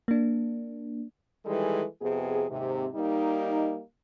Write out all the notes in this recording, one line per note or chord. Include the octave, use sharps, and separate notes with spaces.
A#3 D4
D#3 E3 G3 G#3 A4
F2 C3 B3 G#4
D#2 G#2 C3
G3 A#3 D#4